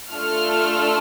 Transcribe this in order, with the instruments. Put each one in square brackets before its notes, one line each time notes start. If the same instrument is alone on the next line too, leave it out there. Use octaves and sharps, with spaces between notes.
[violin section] A3 D4 F4 A4 F6